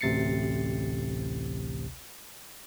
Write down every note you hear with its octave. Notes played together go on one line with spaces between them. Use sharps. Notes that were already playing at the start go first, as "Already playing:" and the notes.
A1 D2 C3 A6 C7 C#7